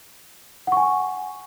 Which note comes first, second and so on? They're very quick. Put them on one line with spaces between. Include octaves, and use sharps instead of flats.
F#5 C#6 G#5